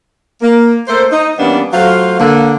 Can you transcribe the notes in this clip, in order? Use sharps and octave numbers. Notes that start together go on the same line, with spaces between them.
A#3
A3 A#3 A4 C5
D#4
E3 G3 A#3 B3 C#4 D4
F#3 A3 F4 C5 F5
D3 A#3